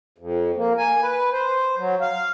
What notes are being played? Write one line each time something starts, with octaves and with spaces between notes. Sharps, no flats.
F2
A#3
G#5
B4
C5
F#3
F5